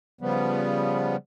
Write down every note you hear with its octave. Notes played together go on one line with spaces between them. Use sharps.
C#3 F3 G3 B3